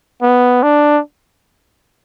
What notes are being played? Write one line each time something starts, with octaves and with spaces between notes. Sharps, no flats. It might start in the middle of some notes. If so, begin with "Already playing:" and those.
B3
D4